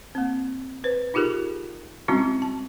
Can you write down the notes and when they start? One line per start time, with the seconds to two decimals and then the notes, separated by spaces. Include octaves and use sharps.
0.15 A#3 C4
0.84 B4 C5
1.14 D#4 F4 G4 G#4 A#4
2.08 G3 G#3 C4 C#4 E4 F#4
2.42 A5